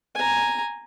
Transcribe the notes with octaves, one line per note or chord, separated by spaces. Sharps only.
G#5 A#5